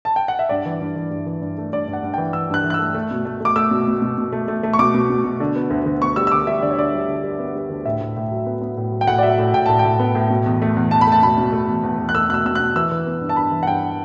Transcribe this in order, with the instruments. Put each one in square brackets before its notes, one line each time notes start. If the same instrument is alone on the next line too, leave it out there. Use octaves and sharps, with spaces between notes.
[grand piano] A5
G5
F#5
E5
G2 D5
E3
G2
E3
G2
E3
G2
A3
G2 D5
G2
F#5
G2
G5
E3
E3 E6
G2 F#6
E3
F#6
E6
A3
A3
B2
A3
A3 D6
A3 E6
B2
B2
B2
B2
A3
A3
A3
C#6
B2 D6
B2
B2
B2
D3
B3
D2
D2
B3 C#6
G3 E6
E6
D3 D6
G3 E5
D2 D5
C#5
D3 D5
G3
D3
G3
B3
G3
D2
A2 E5
A2
A2
F#3
B3
B3
A2
F#3
G5
A2 F#5
D5
F#3 E5
A2
A2 G5
A2 A5
G5
A2
B3
A2
B2
E2
A3
E2
E2 A5
B5
A3 A5
B2 B5
B2
A3
E2
E2
E2
F#6
A3 E6
B2 F#6
E6
B2 E6
F#6
B2
E3 E6
E3
B3
G2
A5
G2 B5
E3
F#5
G2 G5